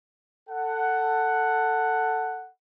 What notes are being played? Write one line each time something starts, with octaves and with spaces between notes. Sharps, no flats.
A4 F#5